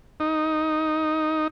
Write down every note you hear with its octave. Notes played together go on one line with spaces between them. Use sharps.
D#4